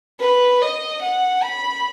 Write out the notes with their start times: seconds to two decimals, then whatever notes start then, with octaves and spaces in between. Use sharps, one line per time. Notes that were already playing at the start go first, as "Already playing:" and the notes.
0.20 B4
0.62 D#5
1.02 F#5
1.42 B5